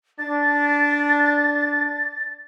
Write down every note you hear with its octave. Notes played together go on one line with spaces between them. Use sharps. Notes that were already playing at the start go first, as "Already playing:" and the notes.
D4 A6